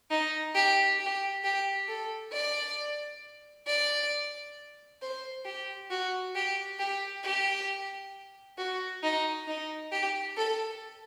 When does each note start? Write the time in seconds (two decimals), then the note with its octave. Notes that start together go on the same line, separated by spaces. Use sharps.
0.11 D#4
0.55 G4
0.99 G4
1.44 G4
1.89 A4
2.33 D5
3.67 D5
5.02 C5
5.46 G4
5.91 F#4
6.35 G4
6.79 G4
7.24 G4
8.58 F#4
9.03 D#4
9.48 D#4
9.92 G4
10.37 A4